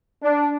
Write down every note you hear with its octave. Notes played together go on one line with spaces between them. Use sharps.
D4